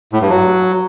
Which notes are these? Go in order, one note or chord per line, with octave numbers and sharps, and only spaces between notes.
A2
G2
F#3